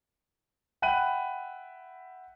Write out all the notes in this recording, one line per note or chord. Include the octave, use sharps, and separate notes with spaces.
E5 F#5 G5 B5 F#6 D#7